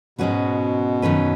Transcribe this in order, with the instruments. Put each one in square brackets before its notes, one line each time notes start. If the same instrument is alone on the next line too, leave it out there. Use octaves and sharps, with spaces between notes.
[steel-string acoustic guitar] G#2 G#3 C#4 F#4 B4 [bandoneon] B2
[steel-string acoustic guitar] F#2 D#3 F#3 C#4 B4